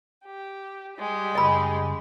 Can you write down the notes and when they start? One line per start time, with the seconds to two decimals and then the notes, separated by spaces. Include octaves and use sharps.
0.24 G4
0.97 G3 G#3 G4
1.35 F#2 C#3 D#5 B5